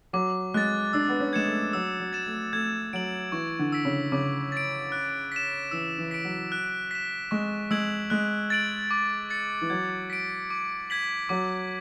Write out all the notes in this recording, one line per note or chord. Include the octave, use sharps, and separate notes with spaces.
F#3 D6
G#3 F#6 A6
D4 E6
B3
C#4
G#3 G#6 C#7 E7
A3
F#3 E6
F#3
A6 E7
A3
A3 G#6
F#3 D7 F#7
E3 C#6
D3
E6 B6 D7
C#3
C#3 D6
A6 D7
F#6
B6 E7
E3 E6
E3
B6 D7
F#3
F#6
B6 E7
G#3 C#6
G#3 E6 G#6 D7 F#7
G#3 F#6
A6 D7 F#7
D6
A6 C#7
E3
F#3 G#6
B6 D7
D6
G#6 B6 F#7
F#3 D6